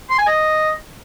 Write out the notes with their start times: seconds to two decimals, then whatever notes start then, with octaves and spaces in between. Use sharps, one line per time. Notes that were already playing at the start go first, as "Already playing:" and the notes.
0.10 C6
0.19 G#5
0.27 D#5